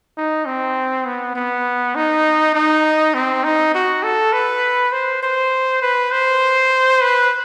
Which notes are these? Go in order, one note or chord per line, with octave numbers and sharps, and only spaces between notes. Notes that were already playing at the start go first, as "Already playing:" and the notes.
D#4
C4
B3
B3
D#4
D#4
C4
D#4
F#4
A4
B4
C5
C5
B4
C5
B4